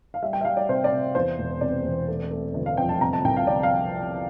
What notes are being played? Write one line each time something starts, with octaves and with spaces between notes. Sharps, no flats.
F5
G3 E5
G5
E5
G3 F5
D5
C3 C5
D5
C3
E2 C5
E1
C3 D5
E1
A3
A3
G1
F5
F2 G5
A5
C3 A#5
A5
C2 G5
F5
C3 D5
F5